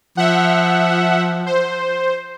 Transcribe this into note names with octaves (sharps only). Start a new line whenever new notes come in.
F3 E5 F#5
C5